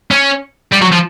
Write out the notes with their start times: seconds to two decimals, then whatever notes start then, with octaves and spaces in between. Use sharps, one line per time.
0.11 C#4
0.73 G3
0.82 F#3
0.92 F3